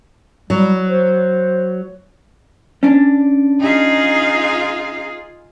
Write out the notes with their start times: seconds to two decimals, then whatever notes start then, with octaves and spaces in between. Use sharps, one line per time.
0.50 F#3 G3
0.87 C5
2.83 C#4 D4
3.60 D#4 F4 G#4 F5